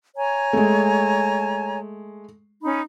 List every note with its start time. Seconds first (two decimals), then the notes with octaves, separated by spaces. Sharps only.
0.16 C#5 G#5 A#5
0.53 G#3 A3
2.63 C#4 D#4 B5